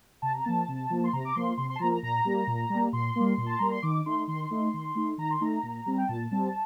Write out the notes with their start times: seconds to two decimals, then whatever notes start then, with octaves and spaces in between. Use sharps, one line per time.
0.22 C3 A5
0.33 A#5
0.44 F3 A#3 A5
0.68 C3
0.90 F3 A#3
1.04 C6
1.13 C3 A#5
1.25 D6
1.35 F3 A#3 C6
1.57 C3 C6
1.70 C6
1.75 A5
1.80 F3 A#3 A#5
1.91 A#5
2.03 A#2 A#5
2.25 G3 A#3
2.47 A#2
2.70 G3
2.75 A#3
2.93 A#2 C6
3.16 G3 A#3
3.38 A#2
3.46 A5
3.58 G3 A#3 A#5
3.71 C6
3.82 D#3 D6
4.06 A3 D#4 C6
4.28 D#3 C6
4.51 A3 D#4
4.74 D#3
4.95 A3 D#4
5.18 D#3 A#5
5.31 C6
5.41 A3 D#4 A#5
5.63 A#2
5.86 G3 C4
5.98 G5
6.08 A#2 A5
6.31 G3 C4